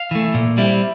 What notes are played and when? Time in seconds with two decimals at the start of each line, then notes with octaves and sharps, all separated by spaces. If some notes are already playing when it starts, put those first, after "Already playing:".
Already playing: F5
0.11 E3 A3
0.34 A#2
0.58 G3 C4 E4